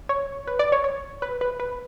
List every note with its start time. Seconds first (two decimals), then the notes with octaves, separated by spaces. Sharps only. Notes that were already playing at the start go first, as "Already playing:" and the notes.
0.09 C#5
0.47 B4
0.59 D5
0.72 C#5
0.84 C#5
1.22 B4
1.41 B4
1.60 B4